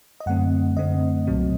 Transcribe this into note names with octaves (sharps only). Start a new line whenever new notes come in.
D#5
F#2 D3 A3 C4 F#5
F#2 D3 A3 C4 D#5
C2 A#2 F#3 C4